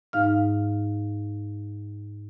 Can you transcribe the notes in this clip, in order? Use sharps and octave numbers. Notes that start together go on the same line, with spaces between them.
G#2 D#4 F5 F6